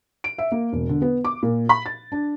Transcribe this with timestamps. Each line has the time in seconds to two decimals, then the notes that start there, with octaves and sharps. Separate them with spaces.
0.24 D7
0.38 E5
0.52 A#3
0.73 E1
0.89 D3
1.02 B3
1.25 D6
1.43 A#2
1.69 B5
1.86 A6
2.12 D4